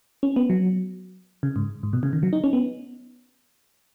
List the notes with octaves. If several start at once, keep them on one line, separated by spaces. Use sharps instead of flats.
C#4
B3
F#3
C#3
G#2
G#2
B2
C#3
D#3
F#3
D#4
C#4
B3